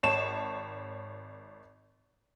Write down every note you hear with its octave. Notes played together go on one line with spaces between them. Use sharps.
G#1 C#5 A5 E7